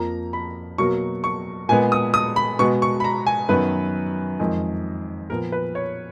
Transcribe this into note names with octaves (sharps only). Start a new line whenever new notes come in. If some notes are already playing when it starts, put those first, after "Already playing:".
Already playing: F2 F3 A#3 A#5
B5
B2 F#3 A#3 C#6
C#6
A#2 G#3 B3 G#5
D#6
D#6
B5
B2 G#3 B3 C#6
C#6
B5
A#5
G#5
F#2 D#3 F#3 B3 B4
F2 D#3 G#3
A#2 F3 B3 A#4
B4
C#5